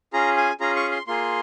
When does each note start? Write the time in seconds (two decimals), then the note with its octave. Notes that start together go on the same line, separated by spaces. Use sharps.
0.13 C#4 F4 G#4 A#5
0.37 G#5
0.60 C#4 F4 G#4 A#5
0.76 C#6
0.92 C6
1.07 A#3 F4 G#4 C6